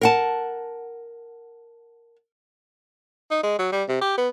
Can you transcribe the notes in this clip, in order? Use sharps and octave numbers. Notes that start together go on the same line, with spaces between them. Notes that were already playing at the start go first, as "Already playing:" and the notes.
A#4 F#5 A5
D#4
G#3
F#3
G3
C3
G4
B3